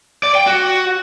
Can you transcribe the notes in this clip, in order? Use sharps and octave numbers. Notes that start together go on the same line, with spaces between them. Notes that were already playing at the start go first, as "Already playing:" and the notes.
D5
G5
F#4